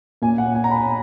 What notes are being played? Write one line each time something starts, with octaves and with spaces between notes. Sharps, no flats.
A#2 G#5
F#5
G#5
A#5
B5